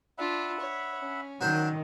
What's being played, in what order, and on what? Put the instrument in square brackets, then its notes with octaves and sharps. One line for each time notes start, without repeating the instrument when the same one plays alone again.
[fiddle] D4 F4 [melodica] E5 F#5 B5
[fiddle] C#5
C#4
[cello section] D#3 [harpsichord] F#3 D4 C5